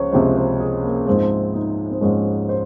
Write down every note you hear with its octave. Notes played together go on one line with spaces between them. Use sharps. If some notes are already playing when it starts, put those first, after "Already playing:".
Already playing: C#2 F3 C5 C#5
C#2 C3 F3 G#3 C5
C5
G#4
A#3
G#2 F3 G#3 C4
D#4
C4
G#2 F3 G#3 C#4
C5